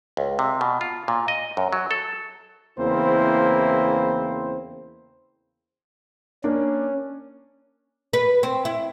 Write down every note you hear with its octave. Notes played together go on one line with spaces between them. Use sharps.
C#2
C3
B2
F4
A#2
D#5
F#2
F#3
A4
E2 C#3 A#3 C4 E4 C5
A#3 C#4 D4
B4
C4
E4